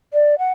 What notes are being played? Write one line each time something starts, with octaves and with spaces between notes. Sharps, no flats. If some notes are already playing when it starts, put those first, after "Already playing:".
D5
F#5